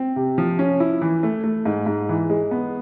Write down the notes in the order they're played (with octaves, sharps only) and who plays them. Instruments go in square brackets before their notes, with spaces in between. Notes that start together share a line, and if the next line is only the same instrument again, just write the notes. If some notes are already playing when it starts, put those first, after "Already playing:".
Already playing: [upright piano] C4
C3
F3
C#4
E4
E3
A3
A3
G#2
G#2
E3
G#3
B3